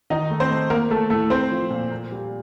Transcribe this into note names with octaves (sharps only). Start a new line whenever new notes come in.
D#3 D#4 D#5
A3
C4 C5
A3
A#3 A#4
A3 A#3 A4
A2 A3 A4
A3 C4 C5
F3
A#2
A#3
G3